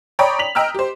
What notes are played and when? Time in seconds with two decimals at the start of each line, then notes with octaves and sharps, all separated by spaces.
0.19 C#5 D5 G5 A#5 B5 D#6
0.39 B6 F7 F#7
0.55 D#5 G5 A#5 E6 F6
0.75 G4 C5